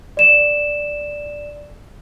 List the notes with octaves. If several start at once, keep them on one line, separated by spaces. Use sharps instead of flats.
D5 E7